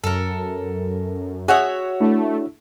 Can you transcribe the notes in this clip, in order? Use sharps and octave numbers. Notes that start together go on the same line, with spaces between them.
F#2 A4 A#4
F#4 G#4 C#5 E5 F#5
A3 D4 E4